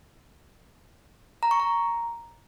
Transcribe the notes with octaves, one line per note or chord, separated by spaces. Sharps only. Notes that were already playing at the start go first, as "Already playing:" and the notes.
A#5
C#6
A#5